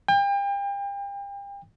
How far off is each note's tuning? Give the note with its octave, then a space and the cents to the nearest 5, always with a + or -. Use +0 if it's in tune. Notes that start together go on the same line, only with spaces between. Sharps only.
G5 +35